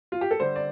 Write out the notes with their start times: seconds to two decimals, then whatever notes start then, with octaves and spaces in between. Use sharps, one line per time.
0.12 F4
0.21 G4
0.31 A4
0.39 D3 G3 C5
0.56 D5